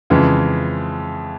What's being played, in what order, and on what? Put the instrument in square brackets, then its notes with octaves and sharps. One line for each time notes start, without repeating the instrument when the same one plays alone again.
[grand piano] F2 C#3 E3 G#3